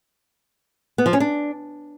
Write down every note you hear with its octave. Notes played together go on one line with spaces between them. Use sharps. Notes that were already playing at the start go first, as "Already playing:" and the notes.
B3
F3
C#4
D4